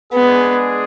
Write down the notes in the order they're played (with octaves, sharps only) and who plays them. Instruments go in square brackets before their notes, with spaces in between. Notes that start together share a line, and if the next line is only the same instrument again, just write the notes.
[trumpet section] G#3 D4 G#4 [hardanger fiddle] B3